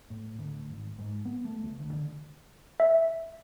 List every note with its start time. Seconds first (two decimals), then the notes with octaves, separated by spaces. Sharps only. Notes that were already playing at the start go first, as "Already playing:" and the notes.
0.10 A2
0.39 D2
0.70 G#1
0.99 G#2
1.25 B3
1.45 A3
1.64 C#2
1.79 D2
1.93 D3
2.80 E5